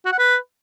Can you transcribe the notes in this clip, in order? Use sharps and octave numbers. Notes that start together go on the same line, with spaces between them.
F#4
F#5
B4